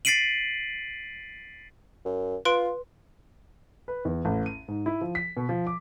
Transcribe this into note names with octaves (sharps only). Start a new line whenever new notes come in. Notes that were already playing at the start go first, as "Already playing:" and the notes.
A6 B6 C7 D7 D#7 F#7
F#2
F4 B4 C6 D7
B4
E2
A1
D#7
G#2
E4
F3
B6
B2
F3
D6